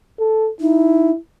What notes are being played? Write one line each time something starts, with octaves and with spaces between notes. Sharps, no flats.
A4
D#4 E4